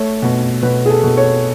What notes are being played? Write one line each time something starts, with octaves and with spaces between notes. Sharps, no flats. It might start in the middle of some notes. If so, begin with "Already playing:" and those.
Already playing: A3 C#5
B2
B2 B4
G#4
A4
B2
C#5